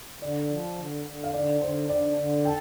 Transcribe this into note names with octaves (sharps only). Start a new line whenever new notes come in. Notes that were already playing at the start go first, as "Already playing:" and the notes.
D3 D5
F3
D3
D3
F5
D3 D5
D3 C5
D3 D5
D3
A4 G5